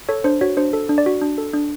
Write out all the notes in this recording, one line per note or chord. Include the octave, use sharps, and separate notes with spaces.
A4 C#5
D4 C5
F#4 C#5
D4 C5
A4
D4
D5
F#4
D4
A4
D4